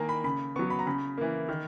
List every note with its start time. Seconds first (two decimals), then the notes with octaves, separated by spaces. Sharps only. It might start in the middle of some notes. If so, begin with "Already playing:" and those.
Already playing: D#3 A#3 G#5 A#5
0.09 B5
0.24 C#3 B5
0.56 F#3 B3 C#6
0.70 B5
0.79 A#5
0.86 C#3 B5
1.18 E3 A#3
1.49 D#3